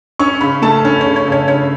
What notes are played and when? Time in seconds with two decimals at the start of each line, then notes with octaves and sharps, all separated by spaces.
0.19 C#4 C#6
0.41 C#3 B5
0.62 A3 A5
0.85 C#4
1.01 C#5
1.05 C#3
1.16 C#5
1.28 C#3 C#5
1.48 C#3 C#5